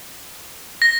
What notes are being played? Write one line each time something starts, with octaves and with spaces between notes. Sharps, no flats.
A#6